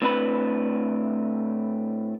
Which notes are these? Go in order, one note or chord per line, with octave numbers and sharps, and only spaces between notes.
A2 C4 D4 B4 B5